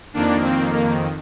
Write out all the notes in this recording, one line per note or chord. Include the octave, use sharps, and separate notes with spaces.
F2 D#3 A#3 D4
C4
A#3